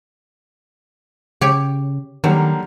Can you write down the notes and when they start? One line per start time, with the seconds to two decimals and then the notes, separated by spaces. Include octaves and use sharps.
1.41 C#3 G4 C#5
2.24 D3 D#3 F#3 G3 A#3